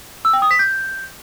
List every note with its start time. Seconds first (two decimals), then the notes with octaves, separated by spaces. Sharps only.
0.25 E6
0.33 G5
0.42 D#6
0.51 B6
0.59 G6